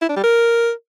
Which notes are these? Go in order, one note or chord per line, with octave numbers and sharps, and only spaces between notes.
E4
D4
G3
A#4